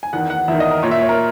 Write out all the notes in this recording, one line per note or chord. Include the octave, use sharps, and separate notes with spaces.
G#5
E2 D#3 F#5
F#5
E2 D#3 E5
D#5
A#4
A#2 C#5
E5
C#5
A#4